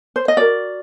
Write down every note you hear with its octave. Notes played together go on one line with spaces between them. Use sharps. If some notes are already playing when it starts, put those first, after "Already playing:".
C5
D#5
F#4 A#4 D5